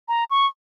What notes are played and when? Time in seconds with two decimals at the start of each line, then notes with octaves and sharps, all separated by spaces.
0.08 A#5
0.31 C#6